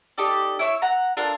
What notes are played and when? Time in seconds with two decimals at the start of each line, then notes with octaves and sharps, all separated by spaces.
0.18 D#4 G4 A4 D5
0.59 E4 C#5 E6
0.82 F#5 A#5
1.17 D4 F4 A4 A#4